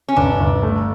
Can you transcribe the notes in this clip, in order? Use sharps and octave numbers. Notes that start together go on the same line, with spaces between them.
C#4
G1 D4
G1
A3